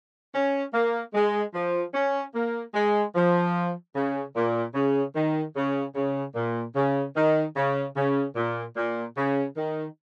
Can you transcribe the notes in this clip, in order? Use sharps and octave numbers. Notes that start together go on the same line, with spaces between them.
C#4
A#3
G#3
F3
C#4
A#3
G#3
F3
C#3
A#2
C#3
D#3
C#3
C#3
A#2
C#3
D#3
C#3
C#3
A#2
A#2
C#3
D#3